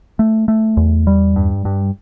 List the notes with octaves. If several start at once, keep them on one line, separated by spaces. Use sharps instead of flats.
A3
A3
E2
G3
G2
G2